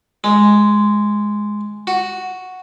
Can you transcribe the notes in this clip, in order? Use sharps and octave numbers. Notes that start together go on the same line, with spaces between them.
G#3
F#4